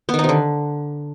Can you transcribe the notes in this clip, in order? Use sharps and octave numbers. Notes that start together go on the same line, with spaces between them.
B3
D#3
D#4
C3
D3